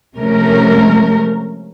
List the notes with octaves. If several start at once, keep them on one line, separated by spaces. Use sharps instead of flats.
C3 F3 G#3 A3 C#4 A#4